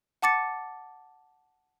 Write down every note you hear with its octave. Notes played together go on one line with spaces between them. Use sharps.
F#5 A5 D6 A6 C#7